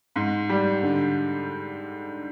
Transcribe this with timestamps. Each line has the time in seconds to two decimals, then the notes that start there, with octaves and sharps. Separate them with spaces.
0.16 G#2
0.49 G3
0.82 D3